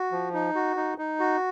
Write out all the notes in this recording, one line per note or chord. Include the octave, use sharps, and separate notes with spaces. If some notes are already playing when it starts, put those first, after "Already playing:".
Already playing: F#4
F3
D#4
F#4
D#4
D#4
F#4